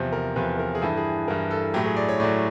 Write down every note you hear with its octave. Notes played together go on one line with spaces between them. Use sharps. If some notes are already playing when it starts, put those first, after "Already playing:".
Already playing: E2 C3 F3
A#4
E2 C3 F3 B4
A#4
G#4
G2 E3 A4
G#4
G2 E3 A#4
A4
A2 F#3 G4
G#4
D5
C#5
A2 F#3 D5